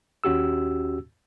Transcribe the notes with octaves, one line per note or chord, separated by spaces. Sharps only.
D#2 C#4 F#4 G4 E6